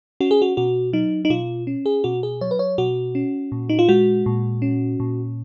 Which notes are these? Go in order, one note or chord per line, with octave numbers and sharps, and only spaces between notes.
C#4 F#4
G#4
F#4
B2 F#4
F#3 D#4
D#4
B2 F4
C#4
G#4
B2 F#4
G#4
F#3 C#5
B4
C#5
B2 F#4
C#4
A#2
D#4
F4
G#3 F#4
A#2
C#4
A#2